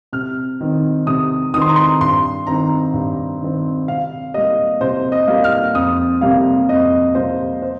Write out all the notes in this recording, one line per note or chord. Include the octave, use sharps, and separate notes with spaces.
C3 F6
D#3 C4
C3 D#6
D#3 C4 C6 D#6
A#5
C6
G2 C6
D#3 C4 A#5
G2
D#3 C4
C3 F5
G3 A#3 D#5
C3 C5
D#5
G3 A#3
F6
F2 D#6
C3 G3 A#3 F5
F2 D#5
C3 G3 A#3 C5
C5